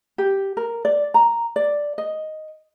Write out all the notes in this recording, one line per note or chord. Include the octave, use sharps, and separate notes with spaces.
G4
A#4
D5
A#5
D5
D#5